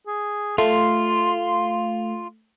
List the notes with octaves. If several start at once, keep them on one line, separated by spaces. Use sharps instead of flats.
G#4
A3 F4 C6